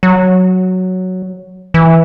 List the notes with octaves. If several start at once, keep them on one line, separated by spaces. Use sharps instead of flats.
F#3
E3